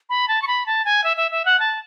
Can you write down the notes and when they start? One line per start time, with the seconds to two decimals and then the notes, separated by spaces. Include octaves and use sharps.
0.09 B5
0.28 A5
0.42 C#6
0.47 B5
0.66 A5
0.85 G#5
1.04 E5
1.17 E5
1.31 E5
1.45 F#5
1.60 A5